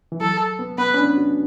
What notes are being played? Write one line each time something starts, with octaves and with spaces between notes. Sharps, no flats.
E3
F#3 A4
B3
B3 B4
C#4
D4
F#4